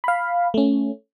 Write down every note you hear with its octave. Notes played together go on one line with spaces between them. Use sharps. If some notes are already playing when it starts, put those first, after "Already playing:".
F5 B5
A3 C#4